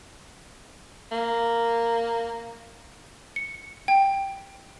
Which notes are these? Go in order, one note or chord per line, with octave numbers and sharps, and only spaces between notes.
A#3
C#7
G5